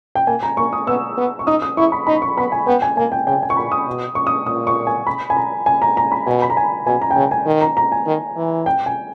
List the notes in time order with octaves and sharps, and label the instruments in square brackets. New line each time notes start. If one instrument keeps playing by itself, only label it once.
[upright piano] G5
[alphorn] A#3 [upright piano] G#5
[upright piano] A#5
[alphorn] A#3 [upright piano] C#6
[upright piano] D#6
[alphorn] B3 [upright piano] E6
[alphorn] B3
[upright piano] C#6
[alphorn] D#4 [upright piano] D#6
[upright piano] D#6
[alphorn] E4 [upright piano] C#6
[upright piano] B5
[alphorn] D#4 [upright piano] B5
[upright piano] C#6
[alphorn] B3 [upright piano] B5
[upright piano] G#5
[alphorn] B3 [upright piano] G5
[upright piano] G#5
[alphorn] A#3 [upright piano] G#5
[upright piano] G5
[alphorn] C#3 [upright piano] G5
[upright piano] G#5
C#6
[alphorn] A#2 [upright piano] B5
[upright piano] D#6
[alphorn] B2
[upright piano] C#6
D#6
[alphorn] A#2 [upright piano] D#6
[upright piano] C#6
G#5
B5
G#5
A#5
G#5
A#5
A#5
B5
[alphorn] B2 [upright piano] G#5
[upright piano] B5
A#5
G#5
[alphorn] B2 [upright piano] G#5
[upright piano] A#5
G5
[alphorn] C#3 [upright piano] G#5
[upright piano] G#5
[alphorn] D#3
[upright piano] A#5
A#5
G#5
[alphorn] D#3
E3
[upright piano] G5
G#5